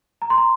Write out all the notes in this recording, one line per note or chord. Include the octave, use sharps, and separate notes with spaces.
A#5
C6
A#5